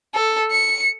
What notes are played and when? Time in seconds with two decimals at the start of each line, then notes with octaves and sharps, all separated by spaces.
0.14 A4
0.52 C#7